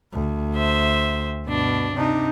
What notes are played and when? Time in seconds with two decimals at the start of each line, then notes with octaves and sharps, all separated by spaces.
0.12 D2
0.55 C5 E5
1.46 G2 B2 D4
1.95 C3 D4 D#4